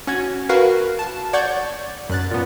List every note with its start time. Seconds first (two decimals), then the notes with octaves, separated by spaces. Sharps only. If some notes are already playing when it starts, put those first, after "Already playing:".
0.07 C#4 F#4 G#6
0.49 F#4 A#4 B4 F5
0.99 A5
1.33 C#5 D5 F#5 C#6 G6 G#6
2.10 F#2 F#6 A6
2.31 A#2 B3